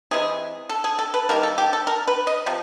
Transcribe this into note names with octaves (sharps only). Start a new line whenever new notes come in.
C3 E3 G#3 G#4
A4
G#4
A4
B4
D#3 G3 A#3 A#4
A4
G4
A4
A#4
B4
D#5
C3 F3